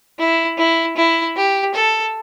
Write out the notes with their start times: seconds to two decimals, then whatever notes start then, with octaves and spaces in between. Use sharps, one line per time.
0.19 E4
0.58 E4
0.97 E4
1.36 G4
1.74 A4